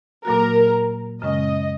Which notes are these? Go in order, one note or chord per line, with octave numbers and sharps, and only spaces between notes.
A#2 F#3 A#3 F#4 A#4
F#2 C#3 G#3 C#4 D#5